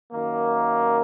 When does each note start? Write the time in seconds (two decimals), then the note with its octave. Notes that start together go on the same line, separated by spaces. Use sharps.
0.12 F#2 D#3 A#3